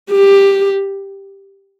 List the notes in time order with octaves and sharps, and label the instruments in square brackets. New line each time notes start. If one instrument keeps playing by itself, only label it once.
[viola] G4